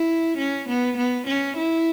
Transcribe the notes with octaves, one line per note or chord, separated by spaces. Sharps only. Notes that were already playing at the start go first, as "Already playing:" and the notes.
Already playing: E4
C#4
B3
B3
C#4
E4